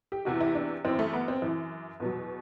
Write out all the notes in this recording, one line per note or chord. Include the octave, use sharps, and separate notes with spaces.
G4
E2 C3 E3 F#4
E4
D4
F#2 E3 C4
A3
B3
C4
F#2 E3
E2 B2 F#3